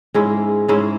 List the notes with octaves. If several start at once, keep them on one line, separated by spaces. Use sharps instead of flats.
G#2 G#3 C#4 E4
G#2 G#3 C#4 E4